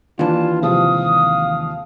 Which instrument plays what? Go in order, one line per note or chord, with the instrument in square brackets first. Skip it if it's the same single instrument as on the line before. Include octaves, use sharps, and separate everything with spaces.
[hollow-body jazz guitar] D#2 E3 [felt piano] D4 [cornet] F4 [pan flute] A5
[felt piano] C3 F3 G#3 [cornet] F5 [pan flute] D#6